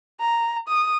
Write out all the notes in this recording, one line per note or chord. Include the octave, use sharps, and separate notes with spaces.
A#5
D#6